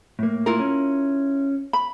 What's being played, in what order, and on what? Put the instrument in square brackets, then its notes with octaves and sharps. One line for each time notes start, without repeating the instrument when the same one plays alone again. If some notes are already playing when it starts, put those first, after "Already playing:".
[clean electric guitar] A2 A#3
[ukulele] E4 F4 A#4
[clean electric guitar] C#4
[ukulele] B5